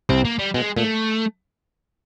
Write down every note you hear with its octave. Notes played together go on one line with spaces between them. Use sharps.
C2 C3 C4
A#3
G3
B2 G#3
A#2 A3